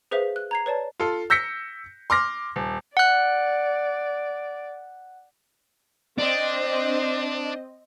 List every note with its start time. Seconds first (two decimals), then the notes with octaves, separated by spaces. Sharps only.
0.11 G#4 B4 C5 E5 F5
0.36 F#6
0.51 A#5 G#6 C7
0.66 B4 C#5 D5 A5
1.00 F4 A4
1.30 E6 G6 A#6 B6 C#7
2.10 C6 D6 F6 A#6
2.56 D#1
2.97 D5 F#5 F#6
6.18 C4 D4 D#5